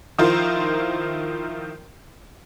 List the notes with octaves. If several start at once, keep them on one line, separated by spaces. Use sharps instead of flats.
D#3 F3 E4 F4 A#4 C5